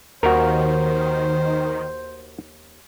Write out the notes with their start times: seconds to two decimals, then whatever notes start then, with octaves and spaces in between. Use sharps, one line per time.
0.23 D#2 D#3 F#4 A#4 C5